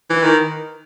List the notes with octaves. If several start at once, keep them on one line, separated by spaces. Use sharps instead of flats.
E3
D#3